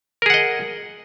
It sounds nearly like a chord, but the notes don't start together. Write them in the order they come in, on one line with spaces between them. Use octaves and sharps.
A#4 G#4 F#5 D#5